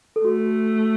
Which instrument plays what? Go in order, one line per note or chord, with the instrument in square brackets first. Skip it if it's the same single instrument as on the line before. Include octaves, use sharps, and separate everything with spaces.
[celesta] A4
[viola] A3 [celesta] F#4